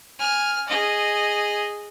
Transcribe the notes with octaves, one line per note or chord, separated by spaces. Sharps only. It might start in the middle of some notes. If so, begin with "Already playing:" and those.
G#5 F6
G#4 D#5